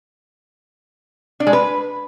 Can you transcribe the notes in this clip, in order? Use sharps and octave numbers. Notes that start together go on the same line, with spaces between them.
D4
G#3
B4